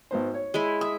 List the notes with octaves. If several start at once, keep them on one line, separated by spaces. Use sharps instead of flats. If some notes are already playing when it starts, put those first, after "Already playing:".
G#1 B3 C5
C#5
G#3 E4
E5 D#6